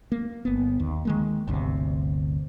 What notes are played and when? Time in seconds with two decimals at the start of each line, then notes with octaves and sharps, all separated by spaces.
0.12 A#3
0.45 G1 B3
0.80 D#2
1.05 D#3 G#3 A#3
1.47 G1 D2 C3